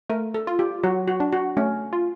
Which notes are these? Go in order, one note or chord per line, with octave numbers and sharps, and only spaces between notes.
A3 A#4
A4
F4
G4
F#3 F#4
F#4
D4
F#4
A3 C#4
F4